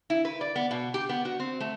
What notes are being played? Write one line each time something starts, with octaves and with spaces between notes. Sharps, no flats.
E4
B4
D5
B3
B2
G4
B3
F#4
C4
A3